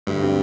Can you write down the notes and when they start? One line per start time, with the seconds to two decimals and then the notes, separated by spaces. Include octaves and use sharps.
0.07 D2 G2
0.22 D3 G3 C4